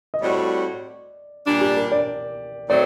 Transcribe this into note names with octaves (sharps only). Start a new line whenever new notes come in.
D#5
A2 G3 C4 F#4 D5
A#2 G3 D4
G4
A#4
D5
D#3 F#3 A3 C4 D5